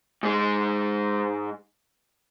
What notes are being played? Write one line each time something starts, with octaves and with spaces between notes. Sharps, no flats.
G#2 G#3